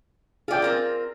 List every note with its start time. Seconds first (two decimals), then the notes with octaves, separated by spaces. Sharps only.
0.48 F4 G#4 D5 G5
0.62 C4 F4 A#4